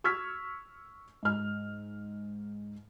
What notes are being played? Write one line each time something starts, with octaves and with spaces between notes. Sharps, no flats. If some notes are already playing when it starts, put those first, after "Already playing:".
C#6 E6 F6 G#6 B6
G#2 F6